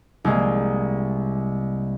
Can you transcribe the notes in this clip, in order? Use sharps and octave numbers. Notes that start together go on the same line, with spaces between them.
C2 G#3 A#3